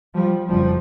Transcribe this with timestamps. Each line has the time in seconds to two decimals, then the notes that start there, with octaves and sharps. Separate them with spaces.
0.14 F3 G3
0.48 F#1 F2 C#3 F3 G3